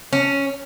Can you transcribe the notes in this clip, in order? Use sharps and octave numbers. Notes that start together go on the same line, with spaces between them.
C#4